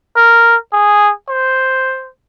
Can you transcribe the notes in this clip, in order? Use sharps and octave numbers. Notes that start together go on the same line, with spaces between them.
A#4
G#4
C5